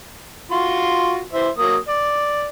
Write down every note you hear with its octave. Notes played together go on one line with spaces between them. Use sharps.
F4 F#4 C6
E3 C5 E5
F#3 A#3 D#6
D5